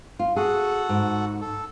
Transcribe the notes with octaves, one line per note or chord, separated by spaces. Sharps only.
F4
F#4 G#4 A4 F#5
G#2
A4